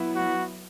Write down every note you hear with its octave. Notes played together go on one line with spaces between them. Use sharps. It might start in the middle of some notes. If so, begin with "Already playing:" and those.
Already playing: F#3 B3 E4
F#4